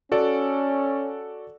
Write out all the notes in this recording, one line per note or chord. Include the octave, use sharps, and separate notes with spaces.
C#4 F#4 A4 D5